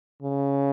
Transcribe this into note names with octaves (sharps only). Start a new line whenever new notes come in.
C#3